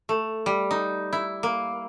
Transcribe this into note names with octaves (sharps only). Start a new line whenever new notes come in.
A3
G3
D#4
E4
A#3